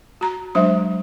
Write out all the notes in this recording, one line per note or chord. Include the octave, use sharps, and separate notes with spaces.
F#4 A#5
F#3 G#3 D4 C5 E5